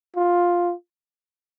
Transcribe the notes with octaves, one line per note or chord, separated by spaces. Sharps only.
F4